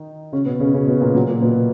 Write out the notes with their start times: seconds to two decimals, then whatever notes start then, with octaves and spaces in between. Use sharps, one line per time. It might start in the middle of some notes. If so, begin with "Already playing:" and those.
Already playing: D#3 D#4
0.32 C#3 C#4
0.46 B2 B3
0.59 C#3 C#4
0.74 C#3 C#4
0.87 B2 B3
1.01 A#2 A#3
1.15 F#3
1.28 A#2 A#3
1.42 B2 B3